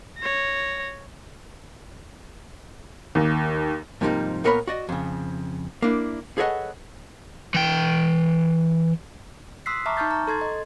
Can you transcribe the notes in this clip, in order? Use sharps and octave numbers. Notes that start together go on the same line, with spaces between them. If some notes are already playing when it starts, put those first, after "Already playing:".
C#5 A#6
D#2
G#2 C3 F3 G3 A#3 D#4
A#2 B3 A#4 C#5 D5 B5
F#4 D5 D#5
F2 C#3
A#3 D4 E4
G#4 A4 B4 C#5 D#5 F#5
E3 G5
C6 D#6 E6 F#6 B6 C7
E5 A5 A#5 C#6 D6 F6
D#4 A5 C#6 F6 G6 A6
A#5 C#6
A4 C6 G#6 A6
D#5